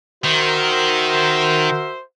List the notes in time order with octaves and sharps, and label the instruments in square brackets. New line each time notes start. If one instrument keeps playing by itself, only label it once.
[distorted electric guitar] D#3 [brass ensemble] F#4 A#4 E5 [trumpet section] C5